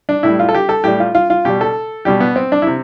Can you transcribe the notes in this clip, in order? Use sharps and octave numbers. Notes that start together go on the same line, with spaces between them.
D4
A2 G3 E4
F4
A4
G4
A4
A2 G3 G4
F4
F4
F4
B2 G3 G4
A4
B2 G3 G4
B3
C4
D4
C3 E4